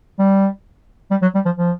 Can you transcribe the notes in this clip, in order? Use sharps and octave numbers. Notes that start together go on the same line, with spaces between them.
G3
G3
F#3
G3
F3
F3